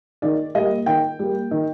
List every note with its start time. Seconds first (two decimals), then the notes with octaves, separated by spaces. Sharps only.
0.22 D#3 D5
0.55 G3 A#3 D#5
0.86 D#3 G5
1.19 G3 A#3
1.51 D#3